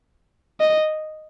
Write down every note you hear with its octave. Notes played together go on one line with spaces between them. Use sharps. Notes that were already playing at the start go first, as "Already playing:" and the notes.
D#5